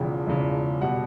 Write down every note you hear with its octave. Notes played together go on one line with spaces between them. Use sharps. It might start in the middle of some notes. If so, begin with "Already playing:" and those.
Already playing: E1 E2 C#3 F3 G5
E1 E2 C#3 F3
B2 G3 F#5